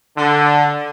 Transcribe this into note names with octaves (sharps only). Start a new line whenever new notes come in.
D3